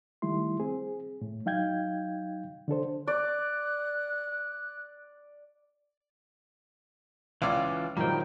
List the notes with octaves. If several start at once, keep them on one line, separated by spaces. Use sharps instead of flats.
D#3 G3 A3 E4 C6
C4 G#4
A2
F#3 D#4 F5 G5 G6 G#6
D3 D4 A4 C5
D5 F#6
C#2 E3 C#4 F4 D5 F5 D6
A#2 D#3 F#3 G3 A#3 C4 G5